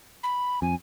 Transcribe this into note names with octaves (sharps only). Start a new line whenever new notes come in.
B5
F2 G#5